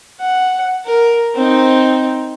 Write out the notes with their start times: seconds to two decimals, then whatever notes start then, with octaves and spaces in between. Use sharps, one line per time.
0.20 F#5
0.85 A#4
1.35 C4 D#4